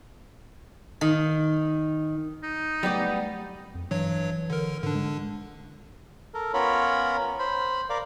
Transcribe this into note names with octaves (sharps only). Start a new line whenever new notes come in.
D#3
D#4
F#3 G3 A3 B3 D5
F2
G2 E3 F#3 C#5
D3 A#4
G#2 D3 D4
G#3
A4 A#4
B3 C#4 F4 A#4 C#5 B5
C5 B5
A#4 D5 F5